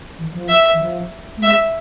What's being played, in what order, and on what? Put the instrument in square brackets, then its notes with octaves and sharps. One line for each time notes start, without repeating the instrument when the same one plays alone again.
[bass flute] E3
F3
[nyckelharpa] E5
[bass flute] E3
F3
A3
[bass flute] G#3 [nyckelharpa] E5